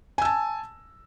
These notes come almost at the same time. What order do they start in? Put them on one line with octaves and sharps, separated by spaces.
G#5 E6 A5